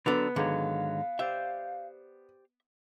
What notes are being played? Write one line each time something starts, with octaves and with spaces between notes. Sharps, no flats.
D3 F#3 B3 D4 A4 A#5
G#2 D3 D#3 F#3 C#5 F5
G4 C5 D5 E5